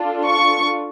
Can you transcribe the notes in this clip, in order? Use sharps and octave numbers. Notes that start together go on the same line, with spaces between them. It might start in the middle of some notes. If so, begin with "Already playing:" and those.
Already playing: D4 F4 A4
C#6